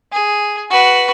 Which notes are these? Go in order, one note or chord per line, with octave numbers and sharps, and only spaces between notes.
G#4
F#4 B4